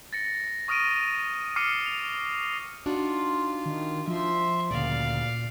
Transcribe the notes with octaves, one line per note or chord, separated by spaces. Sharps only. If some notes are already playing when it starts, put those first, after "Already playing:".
A6 A#6 C#7
C#6 D#6 F6 A#6 D7 D#7
D6 D#6 F6 C7 C#7 D#7
F7
D4 D#4 F4 F#4
D#3
F3 E5 C6
D2 A#2 C#3 D5 F5